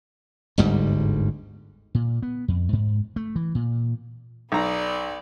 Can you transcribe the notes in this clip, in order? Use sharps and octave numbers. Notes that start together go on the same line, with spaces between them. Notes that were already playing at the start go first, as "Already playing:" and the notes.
G1 D2 G#2 G3
A#2
B3
F2
G#2
A3
E3
A#2
B1 B3 D5 A#5